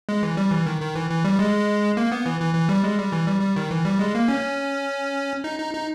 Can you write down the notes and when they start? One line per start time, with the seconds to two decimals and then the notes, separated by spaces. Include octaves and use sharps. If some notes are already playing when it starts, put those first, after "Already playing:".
0.09 G#3
0.23 E3
0.37 G3
0.52 E3
0.66 D#3
0.81 D#3
0.95 E3
1.10 E3
1.25 G3
1.39 G#3
1.97 A#3
2.12 B3
2.26 E3
2.40 E3
2.55 E3
2.69 G3
2.84 G#3
2.98 G3
3.12 E3
3.27 G3
3.41 G3
3.56 D#3
3.71 E3
3.85 G3
3.99 G#3
4.15 A#3
4.28 C#4
5.44 D#4
5.59 D#4
5.74 D#4